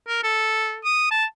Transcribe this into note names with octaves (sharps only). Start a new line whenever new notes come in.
A#4
A4
D#6
A5